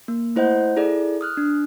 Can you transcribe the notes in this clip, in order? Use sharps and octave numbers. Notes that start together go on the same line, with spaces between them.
A#3
A3 E4 C5 D#5 F#5 G6
E4 G#4 A4 D5
D#6 F6 F#6
D4